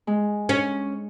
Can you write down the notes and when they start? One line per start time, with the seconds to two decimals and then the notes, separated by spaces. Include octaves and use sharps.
0.07 G#3
0.49 C#4